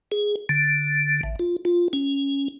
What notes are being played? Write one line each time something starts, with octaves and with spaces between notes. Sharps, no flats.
G#4
D3
A1
F4
F4
C#4